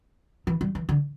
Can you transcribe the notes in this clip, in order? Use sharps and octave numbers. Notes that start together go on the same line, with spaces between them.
E3
G3
E3
D3